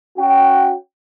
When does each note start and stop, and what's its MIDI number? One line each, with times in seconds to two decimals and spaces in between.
0.17 0.73 61
0.17 0.73 66
0.17 0.73 79